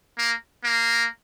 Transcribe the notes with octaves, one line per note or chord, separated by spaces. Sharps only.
A#3
A#3